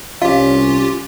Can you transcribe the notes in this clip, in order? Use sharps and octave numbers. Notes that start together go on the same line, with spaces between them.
C2 C#4 F4 G4 F5